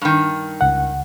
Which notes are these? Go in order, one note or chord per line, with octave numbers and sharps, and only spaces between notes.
G2 D#3
C#2 F#5